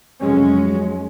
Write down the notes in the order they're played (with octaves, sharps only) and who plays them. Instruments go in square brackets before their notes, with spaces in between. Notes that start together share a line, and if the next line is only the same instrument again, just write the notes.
[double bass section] F1 F#3 G#3 C#4